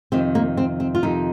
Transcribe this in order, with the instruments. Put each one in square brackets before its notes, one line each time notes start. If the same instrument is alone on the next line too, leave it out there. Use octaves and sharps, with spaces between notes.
[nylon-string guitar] F2 C3 D#3 C4
A#3
C4
C4
F4
F2 C3 D#3 D#4